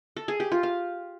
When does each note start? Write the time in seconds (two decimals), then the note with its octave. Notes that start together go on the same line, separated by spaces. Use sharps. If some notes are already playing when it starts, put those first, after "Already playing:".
0.16 A4
0.28 G#4
0.40 G4
0.52 F4
0.63 F5